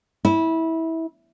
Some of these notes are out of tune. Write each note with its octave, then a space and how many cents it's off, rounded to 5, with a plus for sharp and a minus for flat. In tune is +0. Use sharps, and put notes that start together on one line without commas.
E4 -20